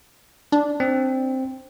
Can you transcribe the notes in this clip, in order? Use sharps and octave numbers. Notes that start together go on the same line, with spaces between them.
D4
C4